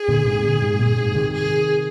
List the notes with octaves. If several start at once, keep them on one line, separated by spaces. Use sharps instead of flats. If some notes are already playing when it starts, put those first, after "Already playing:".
Already playing: G#4
A#2 D3
G#2 C3
A#2 D3
G#2 C3
G2 A#2
G#2 C3
C3 D#3
G#4